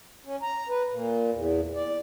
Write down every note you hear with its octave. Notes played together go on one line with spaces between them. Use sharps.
C#4
A#5
B4
A#2
E2
D5